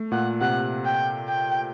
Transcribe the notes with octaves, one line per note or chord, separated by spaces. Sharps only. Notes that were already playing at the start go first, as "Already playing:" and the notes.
Already playing: A3
A#2 F#5
C3 F#5
G5
G5